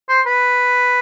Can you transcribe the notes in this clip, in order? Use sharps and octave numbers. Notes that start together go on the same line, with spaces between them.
C5
B4